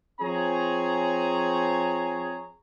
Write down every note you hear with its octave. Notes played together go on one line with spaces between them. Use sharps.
F3 C4 G#4 C#5 G#5 A#5